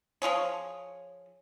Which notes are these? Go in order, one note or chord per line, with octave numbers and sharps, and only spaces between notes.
F3 F4 G#4 C#5